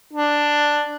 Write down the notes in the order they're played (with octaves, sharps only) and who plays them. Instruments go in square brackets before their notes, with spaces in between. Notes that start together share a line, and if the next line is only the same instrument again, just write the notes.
[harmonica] D4